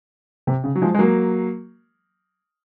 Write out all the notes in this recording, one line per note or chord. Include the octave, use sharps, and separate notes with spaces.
C3
C#3
F#3
F3 G#3
G#3
F#3 A#3